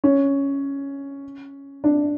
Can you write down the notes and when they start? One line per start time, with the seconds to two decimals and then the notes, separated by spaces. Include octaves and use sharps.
0.04 C#4
1.84 D4